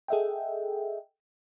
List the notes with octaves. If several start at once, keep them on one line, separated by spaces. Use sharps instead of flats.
G#4 A4 D#5 E5 F#5 G5